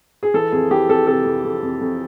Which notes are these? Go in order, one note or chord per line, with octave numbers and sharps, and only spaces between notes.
G#4
E3 A4
F2 G#4
E3 G4
F2 A4
C3 A4
F2
F2
F2
F2